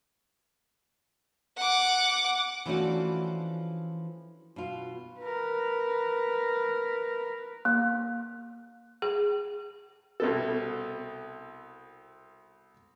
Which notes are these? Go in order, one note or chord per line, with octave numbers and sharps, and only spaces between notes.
F#5 D6
E3 F3 A3 C#4 D4 F#4
B2 F4
A#4 B4
A#3
G#4
C2 B2 A4